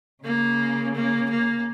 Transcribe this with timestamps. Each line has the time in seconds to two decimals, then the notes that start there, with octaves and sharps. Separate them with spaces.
0.24 C#3 A#3
0.95 A#3
1.30 A#3